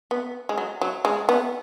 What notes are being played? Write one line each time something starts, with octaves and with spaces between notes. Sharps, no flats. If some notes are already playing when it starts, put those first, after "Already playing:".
B3
G#3
F#3
F#3
G#3
B3